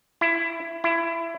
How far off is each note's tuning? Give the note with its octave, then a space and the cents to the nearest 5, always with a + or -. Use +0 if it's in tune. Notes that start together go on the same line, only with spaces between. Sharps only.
E4 +15
E4 +20